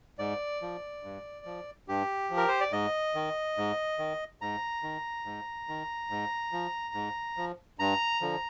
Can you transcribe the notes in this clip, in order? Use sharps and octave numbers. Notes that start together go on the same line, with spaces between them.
G#2 D5
F3
G2
F3
G2 G4
F3
A#4
C5
D5
G#2 D#5
D#3
G#2
D#3
G#2 A#5
D#3
G#2
D#3
G#2
F3
G#2
F3
G2 A#5
D3 F3